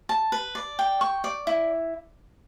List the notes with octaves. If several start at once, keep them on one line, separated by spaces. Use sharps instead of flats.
A5
B4
D5
G5
C#6
D5
E4